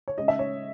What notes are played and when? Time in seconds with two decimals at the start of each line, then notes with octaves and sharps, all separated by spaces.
0.08 C#5
0.18 C#3 G#3 D#5
0.28 E5
0.39 C#5